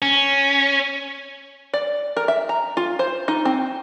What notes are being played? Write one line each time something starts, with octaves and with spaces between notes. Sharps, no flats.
C#4
D5
A#4
E5
A#5
F4
C5
D#4
C4